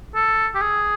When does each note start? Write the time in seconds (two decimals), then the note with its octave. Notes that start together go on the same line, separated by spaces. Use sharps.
0.15 A4
0.55 G4
0.61 G#4